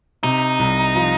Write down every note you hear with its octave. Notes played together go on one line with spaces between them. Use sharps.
C3 D#4
C2
F3